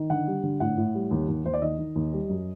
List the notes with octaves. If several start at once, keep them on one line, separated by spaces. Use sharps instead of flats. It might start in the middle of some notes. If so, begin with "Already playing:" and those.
Already playing: D#3
D3 F#5
G3
D3
A2 F#5
A2
G3
D#2
D#2
D#2 C5
D5
D#3 D#5
D#3
D#2
G3
F#2